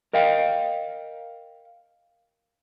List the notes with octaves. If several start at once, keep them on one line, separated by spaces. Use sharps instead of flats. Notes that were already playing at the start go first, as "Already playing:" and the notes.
A#4 D#5 F5 G5